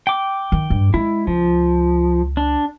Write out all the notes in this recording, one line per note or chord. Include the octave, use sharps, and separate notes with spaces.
G5 D6
D#3
G2
G#3 E4
C#2 F3
D4